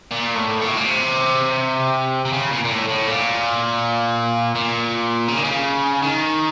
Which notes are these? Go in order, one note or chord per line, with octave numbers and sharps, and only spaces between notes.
A#2
A2
A#2
A2
A#2
C3
C3
C#3
A#2
A#2
A2
A2
A#2
A#2
C#3
D#3
C#3
D#3